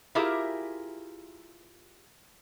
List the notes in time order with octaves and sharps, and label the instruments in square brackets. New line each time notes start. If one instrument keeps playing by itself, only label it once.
[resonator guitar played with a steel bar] E4 F4 G4 G#4 A#4 E5